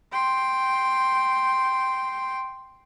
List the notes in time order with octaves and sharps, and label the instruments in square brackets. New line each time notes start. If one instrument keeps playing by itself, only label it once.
[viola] G5 C6